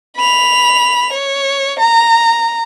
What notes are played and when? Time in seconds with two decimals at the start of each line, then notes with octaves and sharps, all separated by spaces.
0.17 B5 F7
1.13 C#5
1.79 A#5